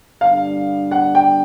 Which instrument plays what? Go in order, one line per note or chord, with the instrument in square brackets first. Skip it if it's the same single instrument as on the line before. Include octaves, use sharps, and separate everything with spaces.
[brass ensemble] G2 D3 G3 B3 D4 [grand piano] F5
[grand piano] F#5
G5